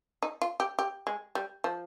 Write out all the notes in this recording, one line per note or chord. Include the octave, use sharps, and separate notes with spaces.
D#4
F4
G4
G4
G#3
G3
F3